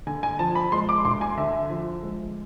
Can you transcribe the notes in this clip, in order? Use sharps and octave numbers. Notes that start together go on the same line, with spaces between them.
D3 G#5
G#5
F3 A5
B5
G#3 C6
D6
D2 C6
G#5
D3 E5
F3
G#3